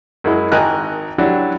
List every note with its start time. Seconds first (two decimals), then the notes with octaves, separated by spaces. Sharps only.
0.24 F#2 G#3 E4
0.52 G#1 D#5 G5 G#5 A#5 F#6
1.18 F#3 D4 E4 F#4 G4